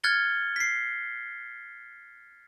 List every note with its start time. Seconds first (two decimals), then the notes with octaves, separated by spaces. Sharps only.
0.04 F6 F#6 G#6 A6 C#7 G7
0.56 B6 C7